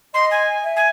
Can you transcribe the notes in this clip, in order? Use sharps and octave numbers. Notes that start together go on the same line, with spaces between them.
D#5 C6
G#5
E5
G#5